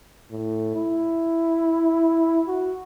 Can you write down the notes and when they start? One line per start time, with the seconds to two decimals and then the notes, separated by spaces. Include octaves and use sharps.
0.31 A2
0.75 E4
2.47 F#4